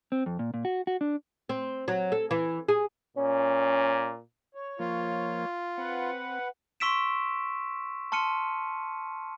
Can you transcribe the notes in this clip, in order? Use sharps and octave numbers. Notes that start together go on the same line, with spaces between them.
C4
F2
A#2
A#2
F#4
F#4
D4
C4
F#3
A4
E3
G#4
A#2 C#4
C#5
F3 A#3 F4
C4 B4 F#5
C6 C#6 E6 B6 D7 E7
A5 C6 F6 C#7 D#7